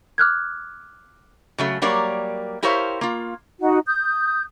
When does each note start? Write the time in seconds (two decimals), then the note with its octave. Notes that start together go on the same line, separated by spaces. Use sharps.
0.18 D6 F6 F#6 G#6
1.58 C#3 F#3 A3
1.82 F#3 G3 A#3 A#4 C#5 D5
2.63 E4 G4 A#4 C5 C#5 F5
3.01 A#3 F4
3.59 D#4 F#4
3.86 D#6 G6